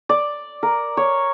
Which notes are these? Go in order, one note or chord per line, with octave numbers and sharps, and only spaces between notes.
D5
A#4
C#5